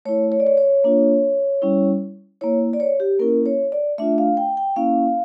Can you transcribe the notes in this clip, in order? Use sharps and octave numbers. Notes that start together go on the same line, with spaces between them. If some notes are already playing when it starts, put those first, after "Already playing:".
A3 E4 C#5
C#5
D5
C#5
C#5
A#3 D4 F4
G3 C#4 E4
A#3 E4 C#5
D5
C#5
G4
A#3 C#4 E4 A#4
C#5
D5
A3 D4 F4 E5
F5
G5
G5
A#3 C#4 E4 F5